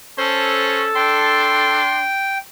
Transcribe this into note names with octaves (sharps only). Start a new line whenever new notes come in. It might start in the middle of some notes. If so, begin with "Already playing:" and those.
C#4 A4 C5
D4 G5 C6